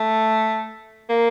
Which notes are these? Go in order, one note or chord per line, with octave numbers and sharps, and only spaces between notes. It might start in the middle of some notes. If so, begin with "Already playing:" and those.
Already playing: A3
A#3